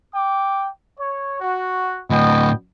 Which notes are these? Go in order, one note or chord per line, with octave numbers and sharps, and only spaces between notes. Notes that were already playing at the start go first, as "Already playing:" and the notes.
G5 D6
C#5
F#4
D2 A2 B3 D#5 G5